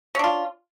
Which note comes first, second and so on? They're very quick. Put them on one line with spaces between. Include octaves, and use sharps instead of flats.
C#4 D4 F4